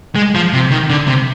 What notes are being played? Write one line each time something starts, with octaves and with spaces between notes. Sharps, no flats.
G#3
F3
C3
D#3
D3
C3